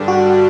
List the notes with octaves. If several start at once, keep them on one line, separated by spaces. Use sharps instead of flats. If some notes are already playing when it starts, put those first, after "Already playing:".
Already playing: G2 D3 G3 D4
F#4